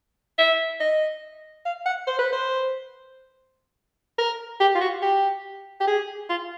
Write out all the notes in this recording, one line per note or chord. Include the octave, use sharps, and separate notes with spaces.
E5
D#5
F5
F#5
C5
B4
C5
A#4
G4
F4
F#4
G4
G4
G#4
F4